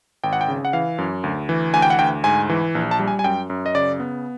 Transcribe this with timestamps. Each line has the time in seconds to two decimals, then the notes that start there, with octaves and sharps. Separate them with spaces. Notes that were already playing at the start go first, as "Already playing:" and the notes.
0.24 G#1 G5
0.33 F#5
0.41 G5
0.48 C#3
0.65 F#5
0.73 E3 F5
0.98 F#2
1.24 D2
1.49 E3
1.74 D2 G#5
1.82 G5
1.90 F#5
1.99 D2 G5
2.24 G#2 G#5
2.49 E3
2.75 A#1
2.91 A5
3.00 G3
3.07 G#5
3.19 G#5
3.24 F#2 G5
3.50 F#2
3.66 D#5
3.75 C#3 D5
4.00 B3